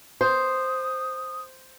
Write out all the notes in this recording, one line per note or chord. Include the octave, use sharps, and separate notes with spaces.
C5 D#6